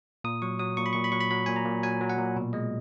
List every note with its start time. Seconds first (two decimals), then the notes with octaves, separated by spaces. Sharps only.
0.24 A#2 D#6
0.42 F#3 C#6
0.59 F#3 D#6
0.77 A#2 C#6
0.86 B5
0.93 A#2 C#6
1.04 B5
1.12 F#3 C#6
1.21 B5
1.31 F#3 B5
1.46 A#2 G#5
1.56 A#5
1.65 A#2
1.83 F#3 G#5
2.01 F#3
2.10 F#5
2.19 A#2
2.36 B2
2.53 G#3 D#5